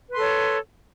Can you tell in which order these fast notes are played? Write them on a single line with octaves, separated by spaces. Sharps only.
B4 C6 A4 C#5